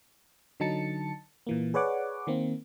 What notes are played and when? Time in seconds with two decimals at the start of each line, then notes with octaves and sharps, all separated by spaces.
0.60 D3 F#3 D#4 A5 A6 C#7
1.47 A#2 E3 A#3
1.74 G#4 B4 C#5 D5 F#5 D6
2.27 D#3 A#3 C4